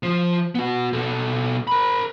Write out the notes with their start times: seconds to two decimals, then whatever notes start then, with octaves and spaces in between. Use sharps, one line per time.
0.03 F3
0.55 B3 F#4
0.93 B2 A4
1.67 A#4 B5